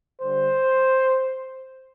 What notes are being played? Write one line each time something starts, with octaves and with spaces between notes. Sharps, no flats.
D3 G3 C5